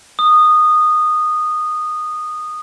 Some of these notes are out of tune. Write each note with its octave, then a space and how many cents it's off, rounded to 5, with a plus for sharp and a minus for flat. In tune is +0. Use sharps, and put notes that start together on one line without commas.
D#6 -15